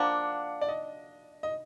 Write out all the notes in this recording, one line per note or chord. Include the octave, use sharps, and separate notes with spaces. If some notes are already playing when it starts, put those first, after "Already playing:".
Already playing: F3 A#3 D4 F#5
D5
D#5
D#5